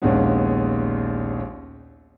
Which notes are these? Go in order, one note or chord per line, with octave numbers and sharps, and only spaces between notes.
A#1 D#2 G#3 B3 C#4